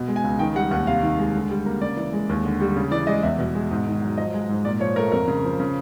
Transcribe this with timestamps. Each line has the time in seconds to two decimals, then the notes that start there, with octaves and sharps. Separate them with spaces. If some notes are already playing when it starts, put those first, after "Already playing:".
Already playing: B2
0.08 G#3
0.16 G#5
0.24 C#2
0.39 D#3 G5
0.55 G3 F#5
0.71 D#2 F#5
0.87 C3 F5
1.03 D#3
1.19 G#3
1.35 D3
1.50 G3
1.66 A#3
1.81 C#3 D5
1.97 E3
2.13 G#3
2.29 D#2
2.45 D3
2.60 G3
2.76 C#3
2.91 E3 D5
3.07 G#3 D#5
3.23 E2 E5
3.39 B2
3.55 G#3
3.71 G#2
3.86 D#3
4.02 F#3
4.17 F3 D#5
4.34 G#3
4.49 G#2
4.65 A#2 D5
4.80 F3 C#5
4.96 A3 A#4
5.12 F2 A#4
5.28 C#3
5.44 F3
5.60 C#3